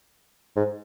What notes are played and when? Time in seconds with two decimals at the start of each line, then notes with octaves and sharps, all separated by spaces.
0.56 G#2